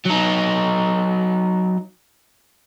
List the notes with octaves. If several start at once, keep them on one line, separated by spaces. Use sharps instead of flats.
F#3 D#4